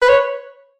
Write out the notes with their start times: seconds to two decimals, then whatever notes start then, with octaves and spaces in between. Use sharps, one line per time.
0.02 B4
0.09 C#5